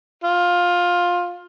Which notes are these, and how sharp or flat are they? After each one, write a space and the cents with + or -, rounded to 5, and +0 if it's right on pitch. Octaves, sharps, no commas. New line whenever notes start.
F4 +15